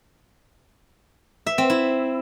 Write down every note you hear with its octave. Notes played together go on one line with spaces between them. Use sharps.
E5
C4
E4